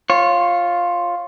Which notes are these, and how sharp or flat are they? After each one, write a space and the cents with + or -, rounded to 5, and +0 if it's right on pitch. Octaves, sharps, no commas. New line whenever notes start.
F4 +5 C#5 -20